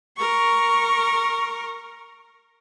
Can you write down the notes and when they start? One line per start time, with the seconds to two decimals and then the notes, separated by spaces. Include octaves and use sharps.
0.17 A#4 C#6